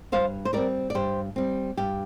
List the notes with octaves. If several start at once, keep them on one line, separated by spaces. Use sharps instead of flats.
G2 C5 F5
C5
G3 C4 A#4 D5
D5
G2 G4 C5
G3 C4
G2 G4